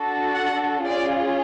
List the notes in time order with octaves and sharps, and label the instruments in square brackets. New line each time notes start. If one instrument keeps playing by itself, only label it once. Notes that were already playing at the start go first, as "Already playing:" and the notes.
Already playing: [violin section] D4 F#4 A4
F#5
C#4 F4 G#4 D5